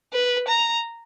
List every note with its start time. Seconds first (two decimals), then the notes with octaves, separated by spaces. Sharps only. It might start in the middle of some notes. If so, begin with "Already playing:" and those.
0.13 B4
0.48 A#5